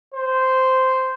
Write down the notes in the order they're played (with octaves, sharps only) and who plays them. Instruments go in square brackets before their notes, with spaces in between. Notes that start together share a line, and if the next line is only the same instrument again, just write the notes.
[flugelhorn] C5